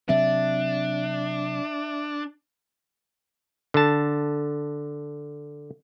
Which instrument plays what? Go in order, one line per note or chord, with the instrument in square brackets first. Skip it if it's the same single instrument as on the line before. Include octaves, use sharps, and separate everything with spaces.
[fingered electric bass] C3 F#3 C4 [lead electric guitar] D4 [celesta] E5
[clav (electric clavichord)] D3 A5